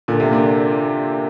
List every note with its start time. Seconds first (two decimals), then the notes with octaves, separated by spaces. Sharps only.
0.08 A#2 D3
0.20 C3
0.31 D3 A#3